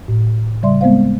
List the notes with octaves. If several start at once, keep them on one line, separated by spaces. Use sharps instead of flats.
A2
C#3 G3 D5 E5 C6
G#3 B3 C4 C5 F5